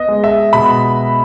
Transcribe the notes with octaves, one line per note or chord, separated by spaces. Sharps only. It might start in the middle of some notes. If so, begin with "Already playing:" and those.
Already playing: B3 D#5
G#3
E5
B2 B5